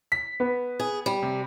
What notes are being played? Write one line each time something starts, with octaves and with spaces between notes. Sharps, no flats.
B6
B3
G#4
G3
C3